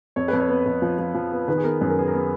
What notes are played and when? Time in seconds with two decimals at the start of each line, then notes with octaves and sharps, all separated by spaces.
0.16 F2 C#5
0.28 F2 B4
0.40 C#5
0.49 B3
0.66 F2
0.82 F3
0.99 F3
1.14 F3
1.32 B3
1.48 D#3 B4
1.58 G#4
1.64 B3 A#4
1.81 F#2 B4
1.89 A#4
1.97 B3 G#4
2.07 A#4
2.14 B3